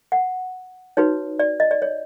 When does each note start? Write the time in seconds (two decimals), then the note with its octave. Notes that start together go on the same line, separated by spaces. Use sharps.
0.12 F#5
0.97 D#4 F#4 B4 C#5
1.39 D5
1.60 D#5
1.71 D5
1.82 C#5